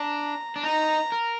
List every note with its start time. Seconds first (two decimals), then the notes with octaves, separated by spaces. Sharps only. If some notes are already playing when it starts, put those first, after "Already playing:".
Already playing: D4 A#5
0.56 D4
0.63 D#4 A#5
1.12 A#4